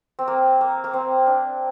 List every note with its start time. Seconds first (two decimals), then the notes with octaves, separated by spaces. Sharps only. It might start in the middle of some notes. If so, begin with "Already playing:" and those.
0.19 C4
0.28 A#3
0.61 A#3
0.84 A#3
0.94 C4
1.27 D4